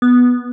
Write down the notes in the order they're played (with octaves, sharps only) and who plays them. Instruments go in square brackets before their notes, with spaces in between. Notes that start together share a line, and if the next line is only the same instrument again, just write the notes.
[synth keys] B3